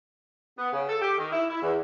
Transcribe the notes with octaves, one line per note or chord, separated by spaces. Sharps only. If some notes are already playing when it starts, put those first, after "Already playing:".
B3
C#3
A4
G4
D#3
E4
E4
E2